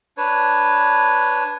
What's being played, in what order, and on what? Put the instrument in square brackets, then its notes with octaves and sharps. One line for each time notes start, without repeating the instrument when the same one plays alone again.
[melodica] D4 B4 C#5